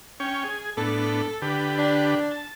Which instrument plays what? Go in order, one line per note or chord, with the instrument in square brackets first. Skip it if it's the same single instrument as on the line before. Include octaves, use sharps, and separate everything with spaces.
[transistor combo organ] C#4 C#5 G5
G#4
[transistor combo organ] A2 B3 D4 [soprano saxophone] A4
[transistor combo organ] D3 G4 B4
[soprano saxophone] D4
[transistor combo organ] A5